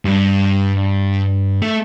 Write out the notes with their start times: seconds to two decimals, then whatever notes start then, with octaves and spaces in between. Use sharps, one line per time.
0.05 G2
1.62 A3